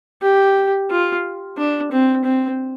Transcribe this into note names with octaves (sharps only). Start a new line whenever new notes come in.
G4
F4
D4
C4
C4